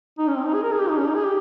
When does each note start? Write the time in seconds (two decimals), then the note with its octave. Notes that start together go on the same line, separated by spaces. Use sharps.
0.19 D#4
0.28 C#4
0.37 C4
0.45 D#4
0.54 G#4
0.63 A#4
0.72 G#4
0.80 G4
0.89 D#4
0.98 C#4
1.07 D#4
1.15 G#4
1.24 G4